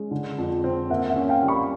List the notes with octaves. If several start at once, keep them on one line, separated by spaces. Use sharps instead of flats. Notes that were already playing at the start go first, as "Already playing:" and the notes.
Already playing: G#3 C#4
D3
F2
C4
A#3 E5 F#5
E5 F#5
C#4
F5 G5
G3
B5 C#6